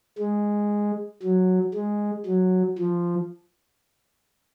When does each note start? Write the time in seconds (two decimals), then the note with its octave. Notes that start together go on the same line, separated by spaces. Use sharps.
0.18 G#3
1.23 F#3
1.74 G#3
2.26 F#3
2.79 F3